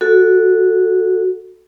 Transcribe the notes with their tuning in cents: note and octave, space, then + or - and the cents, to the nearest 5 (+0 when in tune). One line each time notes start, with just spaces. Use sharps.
F#4 -10 A4 +0